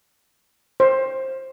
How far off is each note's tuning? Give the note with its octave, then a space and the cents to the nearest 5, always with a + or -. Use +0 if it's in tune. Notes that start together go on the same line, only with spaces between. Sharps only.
C5 +20